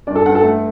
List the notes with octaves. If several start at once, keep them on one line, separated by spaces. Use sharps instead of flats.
G2 D5
A4
G2 F#5
A4
A3